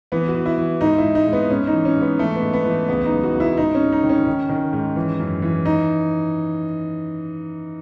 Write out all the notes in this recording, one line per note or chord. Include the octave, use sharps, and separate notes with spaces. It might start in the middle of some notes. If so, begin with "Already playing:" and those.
E3 B3
F#4
E3
E4
E3
G#2 D#4
E4
G#2
D#4
G#2
B3
G#2 C#4
D#4
E3
C#4
G#2
B3
E3 A3
B3
G#2
B3
E3
A3
C#2 B3
D#4
C#2
F#4
C#2
E4
G#2 D#4
C#4
G#2
D#4
D#3
C#4
D#3
D#3
G#2
E3
F#2
E3
D#4